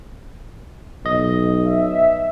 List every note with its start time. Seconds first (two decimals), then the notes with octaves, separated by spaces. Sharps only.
1.06 B1 D#5
1.66 E5